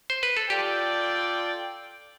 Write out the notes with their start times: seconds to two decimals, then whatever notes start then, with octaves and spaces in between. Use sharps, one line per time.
0.10 C5
0.23 B4
0.37 A4
0.50 F4 G4 A4 D5 G5